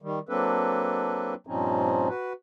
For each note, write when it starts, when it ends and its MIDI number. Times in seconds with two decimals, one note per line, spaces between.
0.02 0.19 51
0.02 0.19 55
0.29 1.34 54
0.29 1.34 58
0.29 1.34 60
0.29 1.34 62
0.29 1.34 69
0.29 1.34 71
1.47 2.08 43
1.47 2.08 46
1.47 2.08 53
1.47 2.08 60
1.47 2.08 61
1.47 2.08 63
2.08 2.33 66
2.08 2.33 71